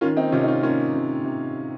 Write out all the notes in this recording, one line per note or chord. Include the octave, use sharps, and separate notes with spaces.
D#3 C#4 F4
C4 D#4
C3 C#4 F4
D#4
C#4 F4
D#3 C#4 F4
C3
C3